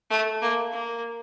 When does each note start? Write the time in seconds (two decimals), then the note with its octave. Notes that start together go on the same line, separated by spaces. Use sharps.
0.10 A3
0.41 A#3
0.72 A#3